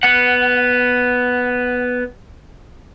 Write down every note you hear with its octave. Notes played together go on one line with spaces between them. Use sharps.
B3 F#5